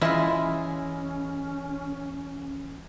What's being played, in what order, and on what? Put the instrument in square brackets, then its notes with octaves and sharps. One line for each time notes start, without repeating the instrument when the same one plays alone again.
[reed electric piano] E3 [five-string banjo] G#3 E5 [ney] C#4 [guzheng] E4 F4